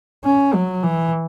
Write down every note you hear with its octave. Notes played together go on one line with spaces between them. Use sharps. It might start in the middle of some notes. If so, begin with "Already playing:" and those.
C#4
F#3
E3